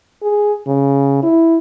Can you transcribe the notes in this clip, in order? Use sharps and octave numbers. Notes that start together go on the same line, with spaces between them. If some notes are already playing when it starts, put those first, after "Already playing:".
G#4
C#3
E4